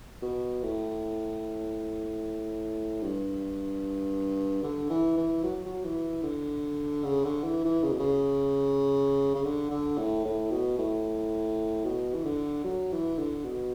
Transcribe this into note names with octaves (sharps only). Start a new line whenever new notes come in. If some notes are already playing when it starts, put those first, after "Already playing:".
B2
A2
G2
D3
E3
E3
F#3
F#3
E3
D3
C#3
D3
E3
E3
C#3
B2
C#3
C#3
D3
D3
A2
A2
B2
A2
B2
E3
D3
F#3
E3
D3
B2